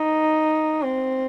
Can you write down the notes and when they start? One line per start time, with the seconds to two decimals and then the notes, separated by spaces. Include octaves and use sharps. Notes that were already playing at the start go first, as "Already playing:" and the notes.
Already playing: D#4
0.83 C4